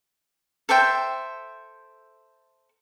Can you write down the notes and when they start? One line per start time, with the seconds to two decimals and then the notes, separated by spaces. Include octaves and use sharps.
0.69 A4 C5 E5 G5